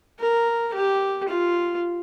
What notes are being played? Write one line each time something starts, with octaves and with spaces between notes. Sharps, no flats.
A#4
G4
F4